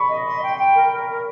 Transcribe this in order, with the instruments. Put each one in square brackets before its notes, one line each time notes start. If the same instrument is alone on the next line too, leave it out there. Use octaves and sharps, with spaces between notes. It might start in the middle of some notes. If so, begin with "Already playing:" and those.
Already playing: [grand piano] B5 C#6
[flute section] D#5
C6
G5
G5
A#4
A#4
A#4